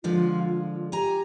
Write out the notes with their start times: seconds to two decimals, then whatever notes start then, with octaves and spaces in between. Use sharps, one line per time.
0.04 D3 F3 G#3 F4
0.43 F4
0.92 G4 G#5 A#5